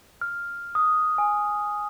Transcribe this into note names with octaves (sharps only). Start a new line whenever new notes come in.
F6
D#6
G#5